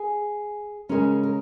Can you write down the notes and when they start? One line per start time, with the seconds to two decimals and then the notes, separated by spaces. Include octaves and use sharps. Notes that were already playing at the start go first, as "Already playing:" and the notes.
Already playing: G#4
0.89 C#3 G#3 C#4 A#4
1.23 A#4